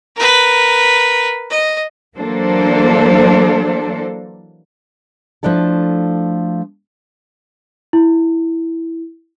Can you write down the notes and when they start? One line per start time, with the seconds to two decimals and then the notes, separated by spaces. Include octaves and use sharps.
0.17 A#4 B4
1.50 D#5
2.17 E3 F#3 A#3 D4 A4 C5
5.43 F3 A3 D4 E4 A4
7.93 E4